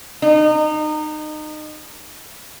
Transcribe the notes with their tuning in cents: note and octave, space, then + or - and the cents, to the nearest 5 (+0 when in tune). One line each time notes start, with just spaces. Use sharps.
D#4 -25